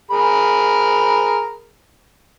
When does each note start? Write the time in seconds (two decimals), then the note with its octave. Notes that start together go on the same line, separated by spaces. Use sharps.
0.11 G#4 A#4 B5